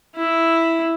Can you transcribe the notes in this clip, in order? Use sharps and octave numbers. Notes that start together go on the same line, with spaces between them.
E4